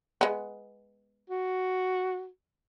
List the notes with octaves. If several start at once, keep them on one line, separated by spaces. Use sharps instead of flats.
G#3 B3
F#4